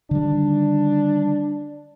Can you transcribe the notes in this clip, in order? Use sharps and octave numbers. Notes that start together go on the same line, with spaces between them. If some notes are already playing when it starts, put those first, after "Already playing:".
D3 D#3 G3 D4